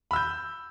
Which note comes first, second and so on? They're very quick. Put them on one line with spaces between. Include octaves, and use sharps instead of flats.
B5 E6 G6